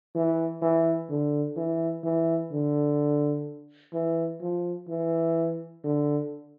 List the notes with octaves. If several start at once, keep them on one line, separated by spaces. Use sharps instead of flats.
E3
E3
D3
E3
E3
D3
E3
F3
E3
D3